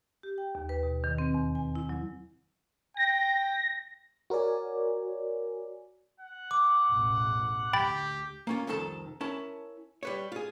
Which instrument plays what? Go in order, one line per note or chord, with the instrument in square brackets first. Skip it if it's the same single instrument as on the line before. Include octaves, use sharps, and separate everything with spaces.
[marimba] G4
G5
D#2
B4
B2
D#3
C4
E2
G#5
E4
F#3
[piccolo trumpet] G5 [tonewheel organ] A#6
[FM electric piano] F#4 A#4 C#5 D5 G#5
[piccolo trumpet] F#5
[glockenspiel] D6
[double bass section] A1 E2 B2
[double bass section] D2 [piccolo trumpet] G4 [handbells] G5 B5 A6
[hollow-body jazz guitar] A#3 C#4 F4
C2 F2 D#3 A4 A5
C#4 E4 A#4 A5
G3 B4 C#5
F4 G#4